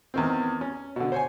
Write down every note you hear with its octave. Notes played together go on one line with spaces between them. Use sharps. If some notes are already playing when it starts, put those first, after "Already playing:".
E2 D#3 C4
C#4
B2 D3
C5 C#5 G#5